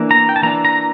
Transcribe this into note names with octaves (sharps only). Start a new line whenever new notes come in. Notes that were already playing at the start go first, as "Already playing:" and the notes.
Already playing: E3 A#3 D4
A#5
G5
A5
E3 A#3 D4 A#5
A#5